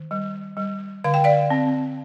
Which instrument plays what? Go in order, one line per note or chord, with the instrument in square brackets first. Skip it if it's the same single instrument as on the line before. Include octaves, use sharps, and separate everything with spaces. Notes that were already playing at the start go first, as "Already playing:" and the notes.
Already playing: [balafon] D#3
G3
G3
D3 F5
G5
D5 F5
C4